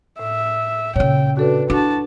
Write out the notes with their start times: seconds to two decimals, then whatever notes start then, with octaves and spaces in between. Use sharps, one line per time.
0.19 A2 E5
0.96 A#2 C#3 C#5 G5
1.37 D4 F#4 A4 B4
1.70 D4 E4 F#4 A5